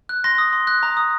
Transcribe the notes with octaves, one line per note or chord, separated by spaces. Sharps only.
F#6
C6 A#6
D#6
C6
F#6
A#5
D#6